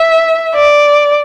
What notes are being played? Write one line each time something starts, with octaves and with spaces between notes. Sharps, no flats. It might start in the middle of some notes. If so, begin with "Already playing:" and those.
Already playing: E5
D5